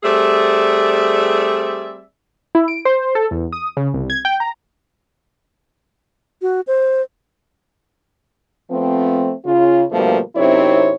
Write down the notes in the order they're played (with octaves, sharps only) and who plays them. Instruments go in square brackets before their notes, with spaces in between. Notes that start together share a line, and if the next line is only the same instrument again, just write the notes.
[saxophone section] G3 A3 C4 G#4 D5 E5
[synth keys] E4
D7
C5
A4
E2
D#6
C#3
C2
G#6
G5
A#5
[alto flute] F#4
C5
[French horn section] F3 A3 B3 C4
C#3 F4
B2 D3 F3 G3 A3 A#3
F#2 C3 C4 D#4 E4 C#5